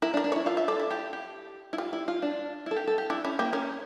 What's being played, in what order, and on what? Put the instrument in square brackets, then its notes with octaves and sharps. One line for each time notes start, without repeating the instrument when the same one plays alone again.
[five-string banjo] E4 [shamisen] A#4
[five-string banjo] D4
[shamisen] A#4
[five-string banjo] D4
[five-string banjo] E4 [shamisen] C#5
[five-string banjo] F4 [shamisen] E5
[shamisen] E5
[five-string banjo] A4 [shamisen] D5
[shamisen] E4
[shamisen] E4 [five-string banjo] G4
[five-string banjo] G4
E4
[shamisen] G3 [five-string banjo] F4
[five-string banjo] E4
F4
D4
E4
A4
G4
A4
G4
[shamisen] D4 [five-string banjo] E4
[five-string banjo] C#4 [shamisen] E4
[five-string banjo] A#3 [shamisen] G4
[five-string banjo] C#4 [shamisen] A#4